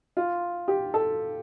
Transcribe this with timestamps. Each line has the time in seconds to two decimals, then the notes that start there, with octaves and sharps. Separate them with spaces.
0.17 F4
0.68 G4
0.94 A4